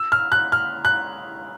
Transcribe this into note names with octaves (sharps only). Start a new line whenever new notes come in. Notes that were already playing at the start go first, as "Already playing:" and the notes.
Already playing: E6
F6
F#6
F6
F#6